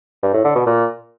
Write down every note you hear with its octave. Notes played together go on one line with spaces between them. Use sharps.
G2
A2
D3
B2
A#2